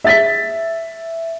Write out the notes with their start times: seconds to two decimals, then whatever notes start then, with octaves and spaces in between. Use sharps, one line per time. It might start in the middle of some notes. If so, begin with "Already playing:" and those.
0.04 E5 A6 B6